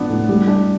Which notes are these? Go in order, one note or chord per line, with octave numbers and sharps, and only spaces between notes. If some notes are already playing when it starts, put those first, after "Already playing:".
Already playing: F3 B3 D4
A2
G3
D4